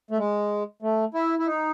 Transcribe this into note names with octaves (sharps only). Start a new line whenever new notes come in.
A3
G#3
A3
E4
E4
D#4